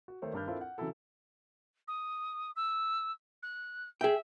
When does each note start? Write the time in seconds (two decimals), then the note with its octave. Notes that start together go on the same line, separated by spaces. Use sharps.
0.08 F#4
0.22 D#3 A3 C5 C#5
0.33 G2 D#3 D4 B5 F6 G6
0.47 C4 D4 E4 F4 A4 A#4
0.61 F#5
0.78 C#3 E3 F#3 C#4 E4 A4
1.88 D#6
2.56 E6
3.43 F#6
4.01 G#4 E5 G5